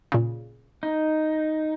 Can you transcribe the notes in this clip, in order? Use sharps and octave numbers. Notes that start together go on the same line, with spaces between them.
A#2 C#3
D#4